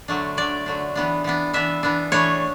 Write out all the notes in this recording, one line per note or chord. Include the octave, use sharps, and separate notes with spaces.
D3 F#3 A3 D4
D3 F#3 A3 D4 D5
D3 F#3 A3 D4
E3 B3 D4
E3 B3 D4
E3 B3 D4 E5
E3 B3 D4
E3 A3 D4 C#5